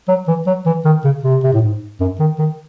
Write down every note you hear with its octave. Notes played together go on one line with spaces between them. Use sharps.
F#3
E3
F#3
E3
D#3
C#3
C3
C3
A2
G#2
F#2
D#3
D#3